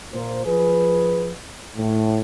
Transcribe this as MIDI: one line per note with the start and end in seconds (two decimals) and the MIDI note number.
0.13 0.43 46
0.13 0.43 58
0.13 0.43 72
0.45 1.30 53
0.45 1.30 68
0.45 1.30 71
1.76 2.20 45